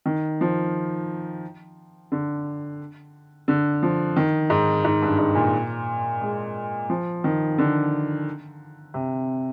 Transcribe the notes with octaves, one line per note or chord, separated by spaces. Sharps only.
D#3
F3
D3
D3
F3
D#3
G#2
G#2
G2
G#2
A#2
G#3
F3
D#3
D3
C3